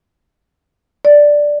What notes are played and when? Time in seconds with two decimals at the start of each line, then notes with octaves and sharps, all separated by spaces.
1.05 D5